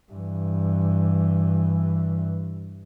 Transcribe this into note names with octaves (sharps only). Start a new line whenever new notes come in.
G2 E3